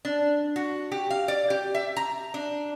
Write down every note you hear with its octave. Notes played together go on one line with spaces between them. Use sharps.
D4
F#4
G4
F5
D5
G4
E5
A#5
D4